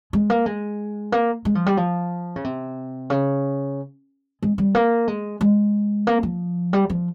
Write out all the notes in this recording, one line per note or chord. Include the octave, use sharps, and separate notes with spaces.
G#3
A#3
G#3
A#3
G#3
F3
G3
F3
C#3
C3
C#3
G#3
G3
A#3
G#3
G#3
A#3
F3
G3
F3